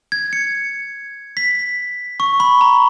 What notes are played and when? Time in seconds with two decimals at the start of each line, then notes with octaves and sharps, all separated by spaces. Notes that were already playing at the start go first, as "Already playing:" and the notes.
0.12 G#6
0.33 C#7
1.37 B6
2.20 C#6
2.40 B5
2.61 A#5